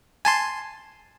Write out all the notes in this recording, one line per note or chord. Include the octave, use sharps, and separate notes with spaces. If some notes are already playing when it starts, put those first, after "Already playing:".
G#5 A5 C6